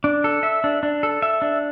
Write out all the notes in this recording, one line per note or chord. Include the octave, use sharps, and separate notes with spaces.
D4
A4
E5
D4
D4
A4
E5
D4